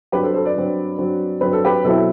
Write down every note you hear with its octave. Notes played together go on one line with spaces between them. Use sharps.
G2 F#3 C4 G4 B4
A4 C5
A4 C5
B4 D5
G2 F#3 C4
G2 F#3 C4
G2 F#3 C4 B4
A4
G4 B4
B2 F#3 C4 E4 A4